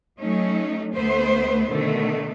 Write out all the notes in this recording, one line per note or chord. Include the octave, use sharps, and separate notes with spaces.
F#3 A3 C#4 D#4
D2 A3 B3 B4 C5
B2 D3 D#3 A3